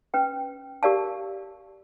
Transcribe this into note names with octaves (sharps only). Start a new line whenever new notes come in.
C#4 B4 G5
G4 A#4 D5 F5 A5